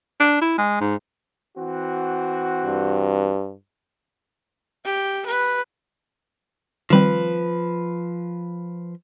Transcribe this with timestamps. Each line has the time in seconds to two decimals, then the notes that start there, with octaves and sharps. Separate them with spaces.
0.20 D4
0.41 E4
0.58 G#3
0.81 G#2
1.57 E3 C4 F#4
2.64 G2
4.85 G4
5.26 B4
6.90 D#3 F3 G3 C4 B4